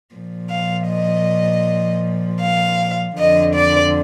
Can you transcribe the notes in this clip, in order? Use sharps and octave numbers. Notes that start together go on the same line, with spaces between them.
A#2 F3
F5
D#5
F5
F2 D3 F3 D#5
D5